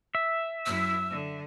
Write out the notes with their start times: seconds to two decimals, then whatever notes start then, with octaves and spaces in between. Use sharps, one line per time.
0.15 E5
0.66 F#2 E4 E6
1.10 D3